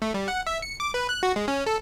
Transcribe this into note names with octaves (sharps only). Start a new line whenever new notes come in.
A3
G3
F#5
E5
C#7
D6
B4
F#6
F#4
G#3
C#4
A4